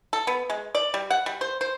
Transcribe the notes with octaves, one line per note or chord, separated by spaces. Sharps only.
A4
B3
G#3
D5
G3
F#5
G3
C5
C5